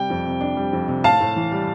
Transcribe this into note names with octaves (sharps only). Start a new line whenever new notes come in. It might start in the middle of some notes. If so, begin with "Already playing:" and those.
Already playing: C3 G3 G5
F2
C3
D4
G3
F2
C3
A2 F5 A5
A2
E3
G3